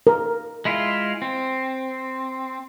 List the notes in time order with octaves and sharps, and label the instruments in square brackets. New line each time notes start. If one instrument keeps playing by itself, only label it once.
[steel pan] A#4
[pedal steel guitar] G#3 E4 F4
C4